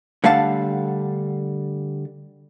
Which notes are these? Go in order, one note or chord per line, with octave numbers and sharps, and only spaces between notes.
D3 G3 A3 F5 F#5 A5